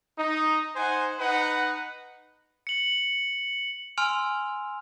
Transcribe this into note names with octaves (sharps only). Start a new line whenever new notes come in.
D#4
D#4 C5 F#5 G#5
D#4 B4 F#5
C#7 F#7
G#5 C6 E6 F6 D7 F7